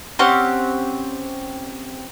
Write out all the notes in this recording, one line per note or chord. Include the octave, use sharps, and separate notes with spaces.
C4 C#4 G4 F#5